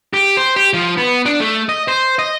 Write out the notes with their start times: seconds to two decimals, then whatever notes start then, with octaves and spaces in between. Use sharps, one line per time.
0.14 G4
0.37 C5
0.56 G4
0.74 F3
0.97 B3
1.26 D4
1.40 A3
1.69 D#5
1.88 C5
2.19 D#5